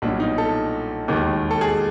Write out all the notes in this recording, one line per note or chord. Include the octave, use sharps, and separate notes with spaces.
B1 A#2 G3 D4
D#4
A4
E1 D#2 D#3
A4
G#4